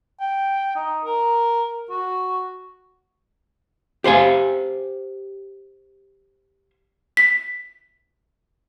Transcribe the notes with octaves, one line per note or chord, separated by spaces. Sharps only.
G5
D#4
A#4
F#4
G4 C5 F5 G#5
B6